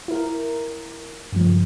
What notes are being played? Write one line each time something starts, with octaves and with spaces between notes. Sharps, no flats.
E4 A#4
G2 C#3 F3